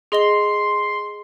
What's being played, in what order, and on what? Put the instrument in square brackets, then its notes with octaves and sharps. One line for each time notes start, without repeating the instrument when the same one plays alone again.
[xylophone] G#4 D#5 G7 [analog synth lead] C6